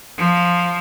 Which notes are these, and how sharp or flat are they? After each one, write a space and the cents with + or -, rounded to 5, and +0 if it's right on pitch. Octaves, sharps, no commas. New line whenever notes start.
F3 +5